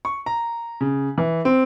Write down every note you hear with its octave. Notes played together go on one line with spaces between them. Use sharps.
C#6
A#5
C#3
E3
C4